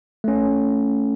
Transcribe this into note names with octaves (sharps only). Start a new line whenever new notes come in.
A3 C#4